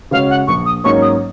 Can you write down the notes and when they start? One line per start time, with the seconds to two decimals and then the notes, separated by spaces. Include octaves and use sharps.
0.11 C#3 G#3 C#4 F#4 F5
0.30 F#5
0.47 A#1 C#6
0.66 D#6
0.84 G#2 F#3 A#3 C#4 C#6
1.02 D#6